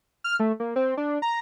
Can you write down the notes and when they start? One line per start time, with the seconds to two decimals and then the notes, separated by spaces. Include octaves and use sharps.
0.24 F6
0.40 A3
0.60 A#3
0.76 C4
0.97 D4
1.22 A#5